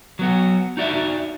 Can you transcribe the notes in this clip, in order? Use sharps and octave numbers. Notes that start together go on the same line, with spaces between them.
F#3 B3 F#4
D#4 F#4 D5 E5